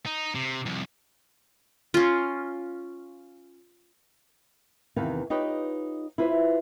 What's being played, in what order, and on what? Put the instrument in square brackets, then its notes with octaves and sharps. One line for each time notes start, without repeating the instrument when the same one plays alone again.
[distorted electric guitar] D#4
C3
C2 F2
[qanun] C#4 F4
[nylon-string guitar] E2 C3 D#3 B4 F5
D#4 F4 G4 B4 C#5 D#5
E4 F4 B4 C5